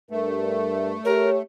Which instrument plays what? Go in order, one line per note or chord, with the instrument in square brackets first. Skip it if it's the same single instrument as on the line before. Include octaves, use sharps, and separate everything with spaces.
[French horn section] G2 A#4 [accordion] A3
[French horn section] G4 C#5 [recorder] A#4